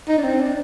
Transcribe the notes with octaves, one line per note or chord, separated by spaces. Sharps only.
D#4
D4
C4
D4